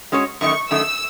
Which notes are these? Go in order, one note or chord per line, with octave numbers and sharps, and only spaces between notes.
G#3 C#4 F#4 C#5
F#2 D#3 A3 C#6
F#2 D#3 A3 E6